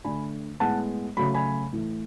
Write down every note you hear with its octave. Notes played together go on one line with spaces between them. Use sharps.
D3 A3 G#5 B5
A2 G#3 B3 F#5 A5
C#3 F#3 A3 B5
G#5 B5
A2 E3 A3